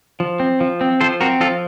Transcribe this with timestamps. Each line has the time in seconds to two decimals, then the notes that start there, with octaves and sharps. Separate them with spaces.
0.20 F3
0.40 C4
0.60 F3
0.81 C4
1.01 F3 A4 C5
1.21 C4 F#4 A#4
1.40 F3 F4 A4